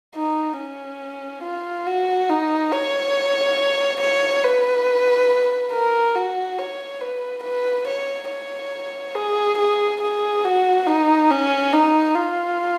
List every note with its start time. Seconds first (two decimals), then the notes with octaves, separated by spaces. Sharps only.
0.15 D#4
0.57 C#4
1.43 F4
1.87 F#4
2.29 D#4
2.72 C#5
4.00 C#5
4.44 B4
5.72 A#4
6.15 F#4
6.59 C#5
7.01 B4
7.44 B4
7.87 C#5
8.29 C#5
9.15 G#4
9.58 G#4
10.01 G#4
10.45 F#4
10.87 D#4
11.31 C#4
11.73 D#4
12.16 F4